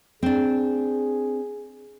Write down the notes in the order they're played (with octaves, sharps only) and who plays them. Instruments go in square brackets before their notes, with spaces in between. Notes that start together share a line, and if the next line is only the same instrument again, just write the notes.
[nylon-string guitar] C4 D4 [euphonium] G#4